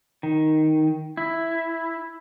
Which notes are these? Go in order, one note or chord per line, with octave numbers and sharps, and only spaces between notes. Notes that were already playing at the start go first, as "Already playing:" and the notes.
D#3
E4